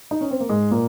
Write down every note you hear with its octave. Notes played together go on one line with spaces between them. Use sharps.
D#4
C#4
C4
A#3
G#2 G#3
A#2 A#3